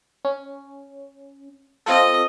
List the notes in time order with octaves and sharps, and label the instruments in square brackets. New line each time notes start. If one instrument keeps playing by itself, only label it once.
[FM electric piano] C#4
[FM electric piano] C4 F4 A4 [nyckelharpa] D#5